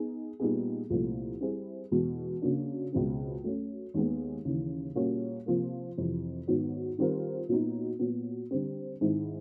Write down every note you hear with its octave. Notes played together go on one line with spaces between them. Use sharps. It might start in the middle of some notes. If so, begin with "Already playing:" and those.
Already playing: B3 D#4 G#4
A#2 G3 B3 D#4 G#4
C2 A#2 F3 A3
G3 C4 E4 G#4
E2 B2 G#3
C#3 F#3 A#3 D4
C#2 B2 G#3 C4
F#3 A3 C#4
D#2 D#3 G#3 B3
D#2 C#3 E3
A#2 G3 A#3 C#4 F#4
C3 F3 A#3
F2 C3 E3
G#2 D#3 F#3 B3
D#3 G3 C4 F4 A#4
A#2 F#3 B3 D#4
A#2 F#3 B3
D3 G3 C4
G#2 D#3 G#3 C4 E4